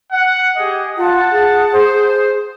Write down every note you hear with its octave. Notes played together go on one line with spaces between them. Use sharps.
F#5
G4 G#4 D#5
F4 F#5 A5
G#4
C5